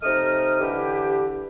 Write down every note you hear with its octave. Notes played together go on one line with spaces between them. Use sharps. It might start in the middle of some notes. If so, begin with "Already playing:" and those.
C3 A3 D#4 D#5 D#6 F6
D3 E3 E4 G4